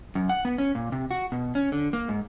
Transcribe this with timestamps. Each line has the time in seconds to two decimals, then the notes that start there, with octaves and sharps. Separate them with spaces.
0.15 F#2
0.29 F#5
0.45 B3
0.58 C#4
0.75 A#2
0.92 C3
1.11 F#4
1.32 B2
1.55 C#4
1.72 D3
1.93 A#3
2.08 G#2